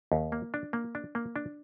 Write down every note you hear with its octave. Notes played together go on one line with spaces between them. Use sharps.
D#2
A#3
D4
A#3
D4
A#3
D4